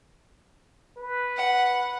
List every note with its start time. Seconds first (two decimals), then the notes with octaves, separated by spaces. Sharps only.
0.97 B4
1.37 F#5